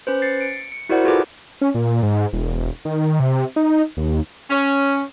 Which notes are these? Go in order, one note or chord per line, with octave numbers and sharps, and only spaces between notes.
C#4 B4 C5
A6 C7 C#7
C#7 D7
C#7
E4 F#4 A#4 C5 D5 F#5
F4 F#4 G#4 A4 B4 D6
C#4
A#2
G#2
E1
D#3
C3
D#4
D#2
C#4